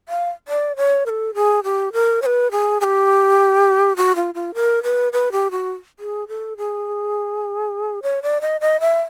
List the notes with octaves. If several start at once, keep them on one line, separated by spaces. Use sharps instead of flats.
F5
D5
C#5
A#4
A4
G#4
G4
A#4
C#5
B4
G#4
G#4
G4
F#4
F4
F4
A#4
B4
B4
G4
F#4
G#4
A4
G#4
C#5
D5
D#5
D#5
E5